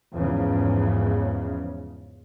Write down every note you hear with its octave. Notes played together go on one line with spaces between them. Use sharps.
E2 G#2 C#3 F3